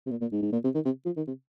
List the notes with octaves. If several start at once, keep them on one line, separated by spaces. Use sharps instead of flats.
C3
A#2
A#2
G#2
G#2
A#2
C3
D#3
C3
F3
D#3
C3